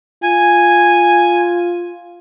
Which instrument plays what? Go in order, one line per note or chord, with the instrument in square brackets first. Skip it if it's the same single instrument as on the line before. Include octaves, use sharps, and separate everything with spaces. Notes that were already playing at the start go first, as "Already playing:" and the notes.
[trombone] F4 [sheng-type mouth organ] G#5